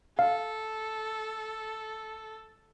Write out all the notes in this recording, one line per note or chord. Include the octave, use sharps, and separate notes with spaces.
A4 F5